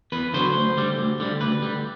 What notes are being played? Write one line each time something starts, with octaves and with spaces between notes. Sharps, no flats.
E2 B4
D3 F#3 C5
D2
D3 G3
D2
D3 G3
D2 B4
D3 G3